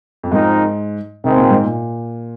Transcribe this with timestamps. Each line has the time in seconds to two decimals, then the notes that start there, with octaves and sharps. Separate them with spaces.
0.23 F2
0.31 G#2 F3 C4 D#4 A#4
1.24 C3 D#3 G#3 C4
1.37 A#2
1.50 G#2
1.64 A#2